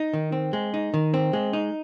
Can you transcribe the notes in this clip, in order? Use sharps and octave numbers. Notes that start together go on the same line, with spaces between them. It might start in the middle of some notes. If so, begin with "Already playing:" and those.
Already playing: D#4
D#3
C4
G#3
D#4
D#3
C4
G#3
D#4